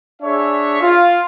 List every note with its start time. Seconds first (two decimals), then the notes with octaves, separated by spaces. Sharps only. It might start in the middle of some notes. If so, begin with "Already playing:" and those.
0.22 D4 G#4 C#5 E5
0.81 F4